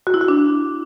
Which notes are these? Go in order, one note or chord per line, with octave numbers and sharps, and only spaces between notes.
F#4
E4
F#4
D4